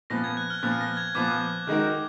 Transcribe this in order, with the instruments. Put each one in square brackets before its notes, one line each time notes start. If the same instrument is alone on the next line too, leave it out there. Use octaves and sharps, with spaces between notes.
[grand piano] A#2 F3 B3 [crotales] A#6
[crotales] G#6
F#6
F6
[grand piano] A#2 F3 B3 [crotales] F#6
[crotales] A#6
G#6
[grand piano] A#2 F3 B3 [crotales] D6
[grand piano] D#3 G#3 D#4 F#4 A#4